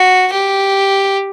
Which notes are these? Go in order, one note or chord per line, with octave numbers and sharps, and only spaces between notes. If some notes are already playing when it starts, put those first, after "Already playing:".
Already playing: F#4
G4